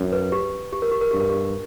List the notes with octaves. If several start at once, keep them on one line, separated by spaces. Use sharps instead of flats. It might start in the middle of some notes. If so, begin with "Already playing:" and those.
Already playing: F#2
B4
G4
G4
A#4
G4
A#4
G2 G4
A#4
G4